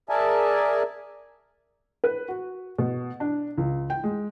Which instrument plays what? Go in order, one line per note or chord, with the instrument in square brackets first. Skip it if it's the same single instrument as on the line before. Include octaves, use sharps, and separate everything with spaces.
[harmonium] G#4 A#4 D5 E5 G#5 A5
[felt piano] B4
F#4
B2
D4
C#2
G5
G#3